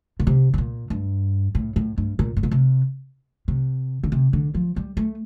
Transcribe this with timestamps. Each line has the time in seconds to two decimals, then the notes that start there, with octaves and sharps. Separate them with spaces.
0.20 A#2
0.27 C3
0.54 A2
0.58 A#2
0.90 G2
1.55 A2
1.76 A2
1.98 G2
2.19 A#2
2.37 A2
2.43 A#2
2.51 C3
3.48 C3
4.03 D3
4.12 C3
4.33 D3
4.55 F3
4.76 G3
4.97 A3